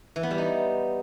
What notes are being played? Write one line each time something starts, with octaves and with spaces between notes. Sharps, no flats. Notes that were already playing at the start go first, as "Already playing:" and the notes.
E3
B3
G3
D#4